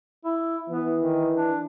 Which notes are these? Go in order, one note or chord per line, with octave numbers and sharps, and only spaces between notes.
E4
E3 B3
D#3
D4